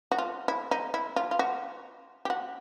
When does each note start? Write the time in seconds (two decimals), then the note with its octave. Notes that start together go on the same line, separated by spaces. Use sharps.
0.12 F#4
0.18 F4
0.48 E4
0.71 D#4
0.94 E4
1.16 F4
1.31 F4
1.39 F#4
2.25 G4
2.30 F#4